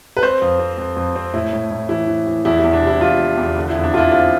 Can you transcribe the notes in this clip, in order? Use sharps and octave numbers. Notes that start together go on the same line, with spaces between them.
B4
C4 C5
F2
C4
F2
F2
C4
A2 E4
A2
A2
E3 E4
E3
E3
E2 E4
E4
E2
D4
C3
E4
E2 F4
F3
E2
D3
E4
F2
D4
D3 E4 F4
C4 F4